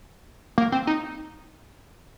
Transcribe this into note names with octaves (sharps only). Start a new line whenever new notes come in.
A#3
C4
D#4